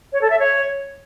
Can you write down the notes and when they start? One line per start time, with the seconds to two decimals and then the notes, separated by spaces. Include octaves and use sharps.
0.12 C#5
0.21 A4
0.30 E5
0.39 C#5